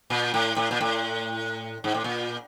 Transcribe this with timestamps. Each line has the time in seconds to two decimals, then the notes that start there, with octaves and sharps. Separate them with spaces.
0.10 A#2
0.34 A2
0.56 A2
0.71 A#2
0.81 A2
1.84 G#2
1.94 A2
2.04 A#2